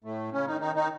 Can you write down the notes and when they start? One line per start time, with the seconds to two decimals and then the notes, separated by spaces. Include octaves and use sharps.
0.04 A2 A3
0.33 C#3 C#4
0.47 D#3 D#4
0.61 D#3 D#4
0.75 D#3 D#4